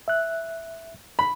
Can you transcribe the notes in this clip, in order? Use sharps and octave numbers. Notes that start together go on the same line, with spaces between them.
E5 F#6
B5